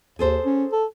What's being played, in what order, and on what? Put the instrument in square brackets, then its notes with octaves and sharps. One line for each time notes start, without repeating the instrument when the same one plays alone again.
[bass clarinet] D#2 [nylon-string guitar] G#4 A4 C5
[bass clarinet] C#4
A4